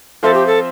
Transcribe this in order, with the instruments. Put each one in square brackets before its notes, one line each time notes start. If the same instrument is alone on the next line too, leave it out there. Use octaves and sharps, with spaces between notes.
[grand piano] F3 C4 F4 C5 E5 [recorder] A4
[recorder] G4
A4